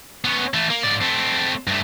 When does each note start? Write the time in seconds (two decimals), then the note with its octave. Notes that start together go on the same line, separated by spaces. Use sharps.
0.25 B3 C#4
0.54 E3 A3
0.70 A#3
0.84 G#2 D5
1.02 A3 C4
1.67 G2 A3